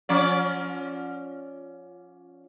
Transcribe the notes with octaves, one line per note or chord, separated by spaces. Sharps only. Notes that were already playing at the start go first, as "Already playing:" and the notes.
F3 C#4 D5